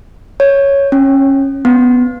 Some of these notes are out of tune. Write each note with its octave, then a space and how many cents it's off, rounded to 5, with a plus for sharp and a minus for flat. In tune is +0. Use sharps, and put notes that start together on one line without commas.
C#5 +0
C#4 -20
B3 +5